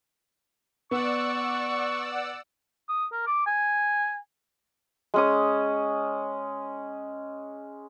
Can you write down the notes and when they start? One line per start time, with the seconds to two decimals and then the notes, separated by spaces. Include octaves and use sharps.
0.91 B3 D5 F#5 C#6 E6
2.89 D#6
3.12 A#4
3.27 D6
3.47 G#5
5.14 G#3 C#4 D#6